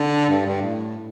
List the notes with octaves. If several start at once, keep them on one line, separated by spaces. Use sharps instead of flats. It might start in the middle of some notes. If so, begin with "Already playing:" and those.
Already playing: D3
G2
G2
A2